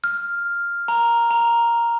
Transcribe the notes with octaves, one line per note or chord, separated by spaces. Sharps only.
F6
A#5
A#5